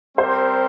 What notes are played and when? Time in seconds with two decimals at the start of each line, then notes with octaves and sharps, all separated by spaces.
0.18 G3 C4 G4 A#4 C5